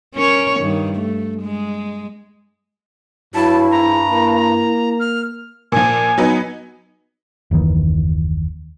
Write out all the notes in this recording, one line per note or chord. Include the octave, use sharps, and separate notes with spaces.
C#4 A#4 C#5
G2 D#3
A3
G#3
G2 F#3 E4 A5
G#2 A#5
A#3 E4
F6
A#2 F3 G#5
F#3 B3 D#4
F#1 D#2 D#3 E3